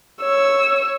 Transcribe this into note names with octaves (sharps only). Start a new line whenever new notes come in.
C#5 E6